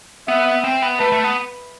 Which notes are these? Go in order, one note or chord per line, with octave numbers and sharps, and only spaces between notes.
B3 E5
C4
B3
A3 B4
A3
B3